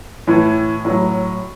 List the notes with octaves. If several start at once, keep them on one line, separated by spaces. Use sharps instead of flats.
A2 E3
A2 F#3